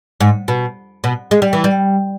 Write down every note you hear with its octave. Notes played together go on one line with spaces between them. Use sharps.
G#2
B2
B2
G#3
G3
E3
G3